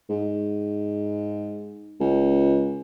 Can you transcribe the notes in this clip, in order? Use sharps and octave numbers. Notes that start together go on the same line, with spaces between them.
G#2
C#2